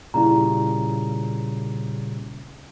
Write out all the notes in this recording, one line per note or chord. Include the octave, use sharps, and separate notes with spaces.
A#2 C#3 G3 E4 A#5